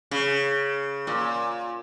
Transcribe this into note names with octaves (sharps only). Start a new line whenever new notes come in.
C#3
A#2